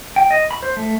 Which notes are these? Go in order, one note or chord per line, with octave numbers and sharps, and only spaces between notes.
G5
D#5
B5
C5
A3